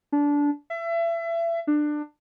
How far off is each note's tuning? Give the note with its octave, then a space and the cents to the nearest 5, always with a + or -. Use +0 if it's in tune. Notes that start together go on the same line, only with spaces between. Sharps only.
D4 -20
E5 +30
D4 +20